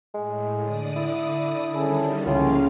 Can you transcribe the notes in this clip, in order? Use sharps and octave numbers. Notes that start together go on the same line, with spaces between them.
A2 G#3
D3 D5 D#6
E4
D3 D#3 G3 C#4 G#4 A4
C#2 A2 F3 A#3 C#4 F4 F5